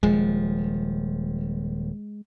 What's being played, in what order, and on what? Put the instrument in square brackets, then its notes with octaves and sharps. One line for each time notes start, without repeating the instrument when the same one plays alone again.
[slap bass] D#1 F3 [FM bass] G#3